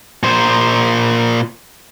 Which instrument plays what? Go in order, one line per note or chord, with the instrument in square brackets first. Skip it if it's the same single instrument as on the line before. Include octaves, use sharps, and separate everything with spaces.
[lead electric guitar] A#2 C5